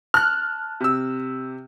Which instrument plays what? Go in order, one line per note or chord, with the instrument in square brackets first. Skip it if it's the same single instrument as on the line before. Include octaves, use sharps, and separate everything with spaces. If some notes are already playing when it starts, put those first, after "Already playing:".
[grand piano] A5 [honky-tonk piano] F6 F#6
[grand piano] C3 E6